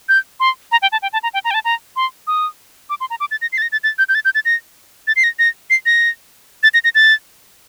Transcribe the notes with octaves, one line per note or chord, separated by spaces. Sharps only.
G6
C6
A#5
G5
A5
G5
A5
A#5
G5
A#5
G5
A5
A#5
C6
D#6
D6
C6
A#5
D6
A6
A#6
C7
A6
A#6
A6
A6
G6
G6
A6
G6
A6
A#6
A6
C7
A#6
A#6
C7
A#6
A6
A#6
A#6
A6